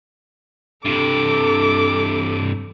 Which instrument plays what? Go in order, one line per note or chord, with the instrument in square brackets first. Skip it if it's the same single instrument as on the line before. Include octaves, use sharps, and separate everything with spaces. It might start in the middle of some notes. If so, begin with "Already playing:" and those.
[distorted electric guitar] G2 C3 [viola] A4 D6